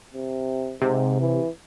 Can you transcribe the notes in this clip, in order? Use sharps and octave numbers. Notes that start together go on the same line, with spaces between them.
C3
G#2 C3
E3